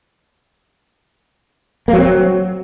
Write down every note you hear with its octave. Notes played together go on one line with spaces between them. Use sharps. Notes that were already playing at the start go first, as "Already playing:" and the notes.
A#3
F#3
C4
F#3